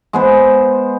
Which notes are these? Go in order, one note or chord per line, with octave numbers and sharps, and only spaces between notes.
G#3 B3 C5